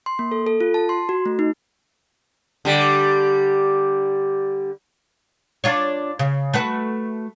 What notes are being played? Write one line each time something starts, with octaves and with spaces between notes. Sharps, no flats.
C6
A#3
A4
A4
F4
A5
C6
F#4
A3
D#4
D3 G3
D4 F4 C#5
C#3
A3 F#4 B4